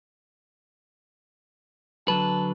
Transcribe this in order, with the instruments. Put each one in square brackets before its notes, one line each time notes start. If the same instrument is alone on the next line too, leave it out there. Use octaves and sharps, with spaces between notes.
[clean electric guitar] D3 F#3 B4 [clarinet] A5